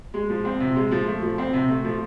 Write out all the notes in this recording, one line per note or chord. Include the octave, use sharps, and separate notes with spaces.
G#3
F3
C4
C3
G#3
F3
A3
F3
C4
C3
A3
F3